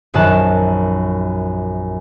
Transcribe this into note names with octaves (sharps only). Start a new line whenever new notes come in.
A#1 F#2 D#3 A5 F#6